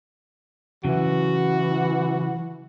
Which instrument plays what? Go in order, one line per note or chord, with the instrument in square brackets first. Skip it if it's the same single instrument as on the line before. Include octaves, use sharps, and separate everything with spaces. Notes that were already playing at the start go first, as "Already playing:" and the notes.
[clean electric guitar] C#3 F#3 [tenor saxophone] E3 [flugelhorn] F#4